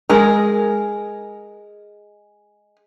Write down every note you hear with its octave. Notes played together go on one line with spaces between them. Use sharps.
G#3 G#4 A#4